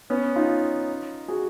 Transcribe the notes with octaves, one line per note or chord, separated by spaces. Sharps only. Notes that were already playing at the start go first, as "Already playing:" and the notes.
B3 C#4
D#4 F4
F#4 G#4